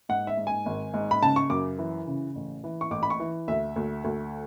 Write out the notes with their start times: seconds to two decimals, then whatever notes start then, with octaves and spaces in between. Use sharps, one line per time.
0.09 G#2 F#5
0.27 E5
0.37 G#2
0.47 G#5
0.66 G#1
0.94 G#2
1.11 B5
1.22 C#3 A5
1.36 C#6
1.50 F#2 D6
1.78 E3
2.07 C#3
2.35 A1
2.64 E3
2.81 C#6
2.91 A1 D6
3.03 B5
3.10 C#6
3.20 E3
3.48 D2 E5
3.76 D2
4.04 D2